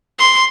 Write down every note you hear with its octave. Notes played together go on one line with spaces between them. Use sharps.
C6